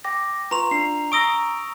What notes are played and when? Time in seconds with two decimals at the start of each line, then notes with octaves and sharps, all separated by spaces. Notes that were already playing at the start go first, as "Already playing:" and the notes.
0.04 G5 D6 A#6
0.51 F4 B4 A#5 C6 C#6 F7
0.71 D4 C7
1.12 A#5 C#6 D#6 E6 A#6 D7 G7